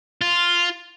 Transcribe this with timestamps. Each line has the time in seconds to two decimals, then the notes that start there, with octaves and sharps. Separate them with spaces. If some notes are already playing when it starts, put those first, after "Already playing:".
0.21 F4